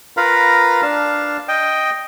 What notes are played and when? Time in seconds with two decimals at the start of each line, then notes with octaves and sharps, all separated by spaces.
0.17 F4 A#4 B4 F5 A#5 B5
0.82 D4 F5 A5
1.48 D#5 G5